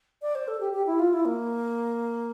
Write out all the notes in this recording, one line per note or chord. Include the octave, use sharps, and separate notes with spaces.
D5
C5
A4
G4
G4
E4
F4
E4
A#3